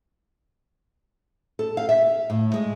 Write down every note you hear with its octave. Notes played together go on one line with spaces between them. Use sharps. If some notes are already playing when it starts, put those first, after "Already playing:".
A4
F5
E5
A2
G#3